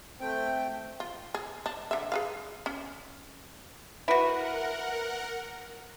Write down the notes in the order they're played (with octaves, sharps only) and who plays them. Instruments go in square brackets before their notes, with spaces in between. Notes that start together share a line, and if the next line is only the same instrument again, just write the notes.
[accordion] A3 G5 [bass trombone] C4
[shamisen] F4
G#4
D4
D3 E5
G#4 B4 F5
C#4
[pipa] E4 F#4 [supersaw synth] A#4 F#5 [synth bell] B4 E5 [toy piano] B5